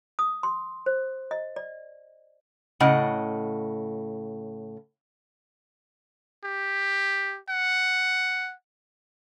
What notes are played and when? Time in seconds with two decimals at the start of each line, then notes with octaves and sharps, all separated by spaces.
0.19 D#6
0.43 C6
0.86 C5
1.31 D#5
1.56 D5
2.80 A2 C#3 D#5 F#5
6.44 G4
7.49 F#5